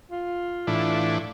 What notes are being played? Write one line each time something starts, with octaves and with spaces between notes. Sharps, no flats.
F4
A2 E3 D4